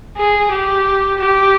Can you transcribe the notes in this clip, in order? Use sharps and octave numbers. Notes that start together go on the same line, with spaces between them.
G#4
G4
G4